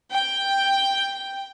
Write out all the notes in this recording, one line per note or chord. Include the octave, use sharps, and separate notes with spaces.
G5